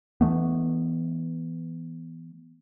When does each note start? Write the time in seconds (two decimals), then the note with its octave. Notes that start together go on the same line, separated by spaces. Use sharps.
0.21 E3 F3 A3 B3